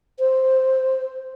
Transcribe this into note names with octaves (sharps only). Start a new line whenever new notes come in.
C5